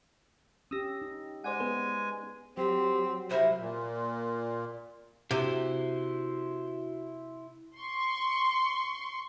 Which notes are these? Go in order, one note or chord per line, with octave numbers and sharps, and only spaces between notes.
C#4 G4 D#6 E6 A#6
D#4
G#3 C5 D5 F#5 G#5
B3 G#4 B4
F#3 C4 G4
C3 E4 A#4 C5
A#2
C3 E4 F#4 C5
C6 C#6